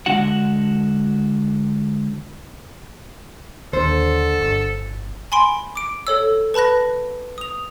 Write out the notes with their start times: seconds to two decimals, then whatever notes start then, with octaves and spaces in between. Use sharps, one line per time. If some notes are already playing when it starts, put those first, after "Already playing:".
0.06 D3 G#3 D4 F#4 F#5
3.73 D#2 D3 A4 C5
4.41 G1
5.32 G#5 B5 C6 D7
5.76 D6 D7
6.07 A4 C#5 E6
6.54 B4 A5 B5 F#6 A#6
7.38 D#6 F7